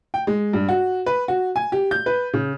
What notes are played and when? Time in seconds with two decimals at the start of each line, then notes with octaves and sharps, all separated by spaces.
0.14 G5
0.27 G#3
0.53 G2
0.69 F#4
1.06 B4
1.28 F#4
1.56 G#5
1.72 G4
1.91 G6
2.06 B4
2.33 C#3